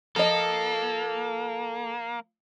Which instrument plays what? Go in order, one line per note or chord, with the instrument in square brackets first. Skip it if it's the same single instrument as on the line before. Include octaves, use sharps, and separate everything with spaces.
[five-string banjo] F3 D#5 [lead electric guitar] A#3 [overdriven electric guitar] A4